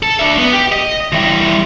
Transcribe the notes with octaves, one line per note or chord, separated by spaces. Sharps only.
A4
D4 E5
B3
G4
D#5
E3 G3